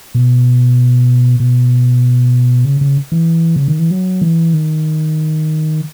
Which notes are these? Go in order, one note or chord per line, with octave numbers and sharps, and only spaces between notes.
B2
B2
C#3
C#3
E3
C#3
D#3
E3
F#3
E3
D#3